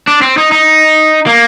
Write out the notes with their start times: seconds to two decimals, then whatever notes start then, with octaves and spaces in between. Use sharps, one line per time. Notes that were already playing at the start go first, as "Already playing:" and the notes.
0.08 D4
0.22 C4
0.37 D#4
0.52 D#4
1.27 A#3